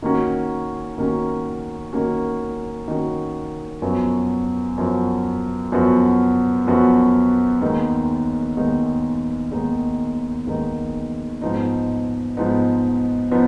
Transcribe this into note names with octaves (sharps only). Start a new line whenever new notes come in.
D#3 A#3 C#4 F#4
D#3 A#3 C#4 F#4
D#3 A#3 C#4 F#4
D#3 A#3 C#4 F#4
F#2 F3 B3 F#4
F#2 F3 B3 F#4
F#2 F3 B3 F#4
F#2 F3 B3 F#4
D#2 D#3 G#3 B3 D#4
D#2 D#3 G#3 B3 D#4
D#2 D#3 G#3 B3 D#4
D#2 D#3 G#3 B3 D#4
G#2 F3 B3 D#4
G#2 F3 B3 D#4
F3 B3 D#4